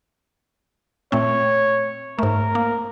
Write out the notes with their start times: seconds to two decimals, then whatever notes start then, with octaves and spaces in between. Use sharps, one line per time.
1.12 A#2 A3 C4 C#5
2.19 G#2 A3 A#4
2.55 A#3